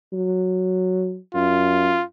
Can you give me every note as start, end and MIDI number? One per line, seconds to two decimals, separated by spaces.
0.13 1.17 54
1.35 1.99 42
1.35 2.03 65